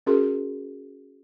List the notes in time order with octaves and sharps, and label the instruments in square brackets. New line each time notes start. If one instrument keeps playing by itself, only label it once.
[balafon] C#4 F#4 G#4 A#4 C6